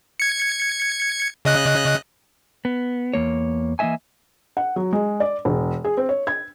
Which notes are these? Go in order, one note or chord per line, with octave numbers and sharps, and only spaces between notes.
G#6 C#7
C#3 D#5 F#6
B3
E2 A#3 C#5
E3 A#3 C#4 D#5 E5 G#5
F#5
F#3
G#3
D5
E1
G#4
C4
C#5
G#6